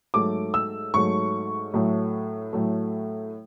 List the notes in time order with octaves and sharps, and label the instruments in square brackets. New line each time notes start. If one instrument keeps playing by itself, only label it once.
[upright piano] G#2 F#3 A3 D6
E6
G#2 F#3 A3 C#6
A2 F#3 A3
A2 F#3 A3